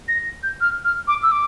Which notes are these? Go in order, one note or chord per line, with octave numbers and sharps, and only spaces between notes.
A#6
G6
F6
F6
D6
E6
D6